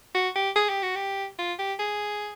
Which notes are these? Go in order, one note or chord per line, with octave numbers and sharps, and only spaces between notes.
F#4
G4
G#4
G4
F#4
G4
F4
G4
G#4